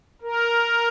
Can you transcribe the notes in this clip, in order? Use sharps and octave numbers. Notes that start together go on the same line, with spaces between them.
A#4